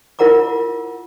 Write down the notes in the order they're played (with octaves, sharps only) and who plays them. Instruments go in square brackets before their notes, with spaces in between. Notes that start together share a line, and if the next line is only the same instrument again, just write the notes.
[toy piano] E4 F4 A#4 F#5 A#5 D6